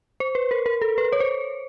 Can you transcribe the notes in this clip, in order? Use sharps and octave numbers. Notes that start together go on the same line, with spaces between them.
C5
B4
A#4
A#4
A4
B4
C#5
C5